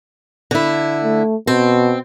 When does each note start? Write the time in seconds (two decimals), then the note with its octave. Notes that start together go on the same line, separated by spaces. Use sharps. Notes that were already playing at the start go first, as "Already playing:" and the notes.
0.51 D3 E4
1.03 A3
1.47 B2 C4